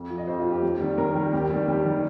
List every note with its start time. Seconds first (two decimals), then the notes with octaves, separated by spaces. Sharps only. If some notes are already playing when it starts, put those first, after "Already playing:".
Already playing: F2 F5
0.10 F3
0.18 D#5
0.27 F2 C5
0.40 F4
0.45 F3
0.51 G4
0.63 D#2
0.80 D#3 G3
0.98 D#2 A#4
1.15 D#3 G3
1.33 D#2 G4
1.50 D#3 G3
1.68 D#2 G4
1.85 D#3 G3